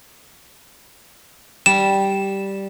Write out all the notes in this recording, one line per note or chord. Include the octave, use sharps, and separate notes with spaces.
G3 E7